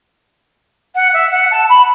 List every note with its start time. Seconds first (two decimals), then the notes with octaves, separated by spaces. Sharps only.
0.95 F#5
1.13 E5
1.31 F#5
1.51 A5
1.69 B5